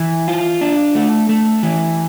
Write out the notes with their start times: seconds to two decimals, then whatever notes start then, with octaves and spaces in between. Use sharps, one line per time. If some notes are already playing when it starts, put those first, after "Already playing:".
Already playing: E3
0.28 F4
0.61 D4
0.95 A3
1.29 A3
1.63 E3